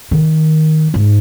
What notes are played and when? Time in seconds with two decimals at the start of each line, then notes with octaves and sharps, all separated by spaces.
0.11 D#3
0.94 G#2